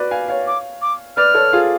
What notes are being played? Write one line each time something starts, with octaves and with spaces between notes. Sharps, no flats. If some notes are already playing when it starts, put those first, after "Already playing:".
Already playing: F#4 B4 D5
F5 G#5
C#5 F5
D6
D6
B4 D5 F6
A4 C#5
F4 G#4